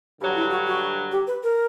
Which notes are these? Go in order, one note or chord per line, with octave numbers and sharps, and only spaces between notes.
G2 D3 F#3 G4
E4
F#4
F#4
G4
B4
A#4